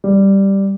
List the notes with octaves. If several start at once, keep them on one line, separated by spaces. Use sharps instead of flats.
G3